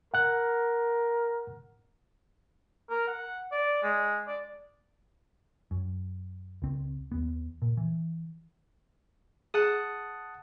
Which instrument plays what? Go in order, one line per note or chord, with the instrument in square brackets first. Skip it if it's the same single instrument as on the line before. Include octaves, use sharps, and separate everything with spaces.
[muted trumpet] A#4 [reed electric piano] F#5 F#6
[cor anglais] A#4
F#5
D5
G#3
D5
[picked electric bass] F#2
C#2 C4
D#2 B3
A#2
E3
[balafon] G#4 [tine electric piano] F#5 A5 D#6